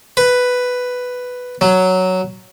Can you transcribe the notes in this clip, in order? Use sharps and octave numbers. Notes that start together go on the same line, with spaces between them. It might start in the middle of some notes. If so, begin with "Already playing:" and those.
B4
F#3